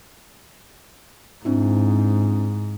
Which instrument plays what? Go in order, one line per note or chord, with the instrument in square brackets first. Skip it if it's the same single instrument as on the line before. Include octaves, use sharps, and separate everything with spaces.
[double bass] G#2 [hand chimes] C4 D4 E4